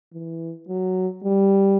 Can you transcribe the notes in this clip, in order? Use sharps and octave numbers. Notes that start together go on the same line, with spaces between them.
E3
F#3
G3